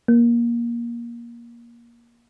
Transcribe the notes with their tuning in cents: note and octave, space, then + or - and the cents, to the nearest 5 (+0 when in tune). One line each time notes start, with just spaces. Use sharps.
A#3 +20